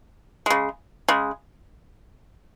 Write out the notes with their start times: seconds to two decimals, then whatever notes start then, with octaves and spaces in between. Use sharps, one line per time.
0.46 C#3 G#3
1.08 C#3 G#3